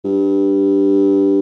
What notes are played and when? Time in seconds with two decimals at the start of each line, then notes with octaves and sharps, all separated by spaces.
0.05 G2